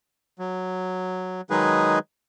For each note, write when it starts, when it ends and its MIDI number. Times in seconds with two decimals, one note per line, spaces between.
0.39 1.41 54
1.50 1.99 51
1.50 1.99 54
1.50 1.99 56
1.50 1.99 63
1.50 1.99 68
1.50 1.99 71